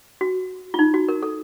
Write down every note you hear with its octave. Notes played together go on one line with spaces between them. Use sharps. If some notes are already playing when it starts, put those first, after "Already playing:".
F#4
F4
D#4
F#4
A#4
A4